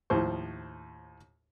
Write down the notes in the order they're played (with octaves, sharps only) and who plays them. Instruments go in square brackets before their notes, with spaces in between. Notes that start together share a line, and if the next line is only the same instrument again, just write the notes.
[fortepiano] D#2 A2 F3 C5 C#6